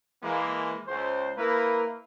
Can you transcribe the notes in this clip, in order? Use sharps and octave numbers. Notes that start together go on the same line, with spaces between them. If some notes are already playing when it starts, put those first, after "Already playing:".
E3 G#3 A#3
C#2 C5
A#3 E4 A#4 B4